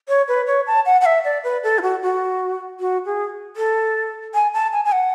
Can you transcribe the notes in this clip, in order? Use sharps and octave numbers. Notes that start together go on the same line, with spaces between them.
C#5
B4
C#5
A5
F#5
F#5
E5
D5
B4
A4
E4
F#4
F#4
F#4
G#4
A4
G#5
A5
G#5
G#5
F#5